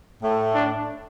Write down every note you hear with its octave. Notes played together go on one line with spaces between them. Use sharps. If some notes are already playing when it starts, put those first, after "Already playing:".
A2 A3
D4